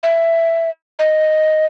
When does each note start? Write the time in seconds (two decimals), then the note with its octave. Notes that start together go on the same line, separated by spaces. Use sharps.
0.03 E5
0.99 D#5